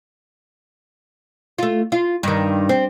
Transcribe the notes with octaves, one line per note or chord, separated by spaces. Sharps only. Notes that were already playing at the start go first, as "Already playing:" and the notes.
A3 F4
F4
G2 D#3
C4